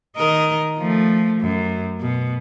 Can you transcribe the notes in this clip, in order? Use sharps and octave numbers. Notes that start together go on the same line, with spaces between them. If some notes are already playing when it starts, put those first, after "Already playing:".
D#3 A#4 D#5
F3 A3
F#2
B2